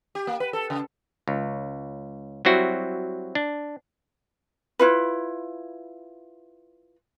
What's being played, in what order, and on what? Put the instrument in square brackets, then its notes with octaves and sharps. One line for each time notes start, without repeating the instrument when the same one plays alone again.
[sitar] G4
A#3
B4
A4
C#3
[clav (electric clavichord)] C#2
F#3 G3 C4 E4 F#4
D4
[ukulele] E4 F4 B4